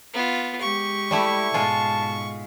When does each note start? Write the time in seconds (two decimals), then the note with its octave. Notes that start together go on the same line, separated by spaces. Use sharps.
0.14 B3 F4
0.61 G#3 G4 C#6
1.11 G3 A3 E4
1.54 G#2 B2 G#3 F4 A5